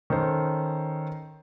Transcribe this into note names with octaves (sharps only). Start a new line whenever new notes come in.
D#3 C#4 A4 C5